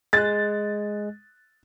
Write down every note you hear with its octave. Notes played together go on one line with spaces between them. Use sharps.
G#3 F#6 A6